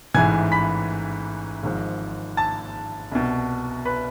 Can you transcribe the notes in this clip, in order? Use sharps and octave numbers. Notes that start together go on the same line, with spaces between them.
A1 G#2 E3 G#5 G#6
B5 B6
G#1 G#2 F3
A5 A6
C2 B2
B4 B5